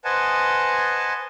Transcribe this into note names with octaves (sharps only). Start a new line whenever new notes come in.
B4 C5 D#5 F#5 G#5 A5